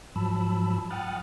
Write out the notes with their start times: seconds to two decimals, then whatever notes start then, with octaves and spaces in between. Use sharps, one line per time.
0.16 G#2 F3 F#3 A5 B5 E6
0.91 F#5 G5 D#6 F6 F#6 A6